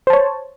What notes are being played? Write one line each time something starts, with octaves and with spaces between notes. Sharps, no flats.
C5 C#5 A5